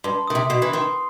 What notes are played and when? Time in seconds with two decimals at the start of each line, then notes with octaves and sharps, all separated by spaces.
0.04 G2 C6
0.27 D#3 D#6
0.35 C3
0.50 B2 C7
0.62 E3
0.73 D#3 C6